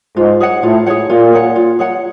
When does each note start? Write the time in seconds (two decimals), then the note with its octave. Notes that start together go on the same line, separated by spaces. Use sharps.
0.17 G#2 F4
0.40 G#4 C#5 F#5
0.63 A2 F4
0.86 G#4 C#5 F#5
1.09 A#2 F4
1.33 G#4 C#5 F#5
1.56 F4
1.79 G#4 C#5 F#5